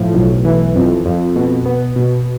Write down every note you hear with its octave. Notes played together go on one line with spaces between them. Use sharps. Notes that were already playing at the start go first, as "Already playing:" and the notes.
Already playing: A2 F3
B1
E3
F2
F2
B2
B3
B2